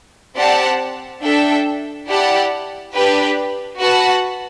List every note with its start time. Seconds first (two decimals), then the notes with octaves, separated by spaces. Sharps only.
0.37 C4 G4 D5 F#5 A5
1.22 D4 A4 E5 G5
2.09 E4 G4 D5 F#5 A5
2.94 D4 G4 B4
3.80 F#4 B4 F#5 A5